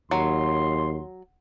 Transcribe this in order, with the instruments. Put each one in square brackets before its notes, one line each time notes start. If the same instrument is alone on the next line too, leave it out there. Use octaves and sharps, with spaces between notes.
[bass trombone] D#2 [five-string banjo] F#3 [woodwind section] C6